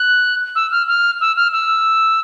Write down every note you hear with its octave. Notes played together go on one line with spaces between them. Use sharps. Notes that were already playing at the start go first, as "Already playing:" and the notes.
Already playing: F#6
E6
F6
F6
E6
F6
E6